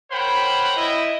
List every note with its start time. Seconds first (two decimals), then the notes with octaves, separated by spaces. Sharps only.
0.11 A#4 C5 C#5 F#5 G5 B5
0.76 E4 D#5